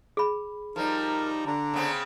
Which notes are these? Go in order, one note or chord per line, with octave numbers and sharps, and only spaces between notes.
G#4 B5
F3 G3 D#4 A#4
D3 D4 A#5
C#3 B3 C4